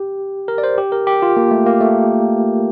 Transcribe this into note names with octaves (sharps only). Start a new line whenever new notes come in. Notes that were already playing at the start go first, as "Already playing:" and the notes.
Already playing: G4
A#4
D5
C5
G4
A#4
G4
F4
A#3
A3
A#3
A3